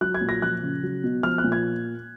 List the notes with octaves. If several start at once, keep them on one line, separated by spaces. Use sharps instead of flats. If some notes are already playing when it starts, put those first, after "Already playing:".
F#3 F#6
G#6
A#2
A#6
F3 F#6
C#3
F#3
B2
F3 F6
F#6
A#2
G#6